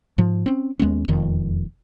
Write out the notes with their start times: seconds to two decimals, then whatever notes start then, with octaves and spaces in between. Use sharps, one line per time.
0.18 G#2 F3
0.46 C4 C#4
0.79 D#2 G#3 B3 C#4
1.08 E1 F2 D#3